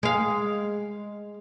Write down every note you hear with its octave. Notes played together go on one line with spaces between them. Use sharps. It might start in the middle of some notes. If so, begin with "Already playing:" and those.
G#3 F5